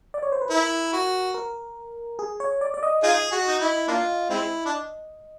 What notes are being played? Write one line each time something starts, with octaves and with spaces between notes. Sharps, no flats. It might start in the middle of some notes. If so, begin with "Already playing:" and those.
D5
C#5
C5
B4
E4 A#4
F#4
A#4
G#4
C#5
D5
D5
D#5
D#4 F4 G#4 D#5
F#4
D#4
E4
A#3 D4 F4
G#3 C4 E4
D4